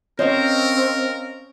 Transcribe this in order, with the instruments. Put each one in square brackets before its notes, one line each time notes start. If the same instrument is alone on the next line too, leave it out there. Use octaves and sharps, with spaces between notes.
[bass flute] C4 [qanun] C#4 C5 [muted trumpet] A#4 [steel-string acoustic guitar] C#5 D#5 F5